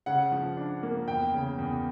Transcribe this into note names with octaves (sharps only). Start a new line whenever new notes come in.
C#3 F#5
F3
D4
A#3
E2 G5
C#3
E2